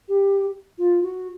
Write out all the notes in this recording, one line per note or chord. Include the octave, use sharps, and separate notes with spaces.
G4
F4
F#4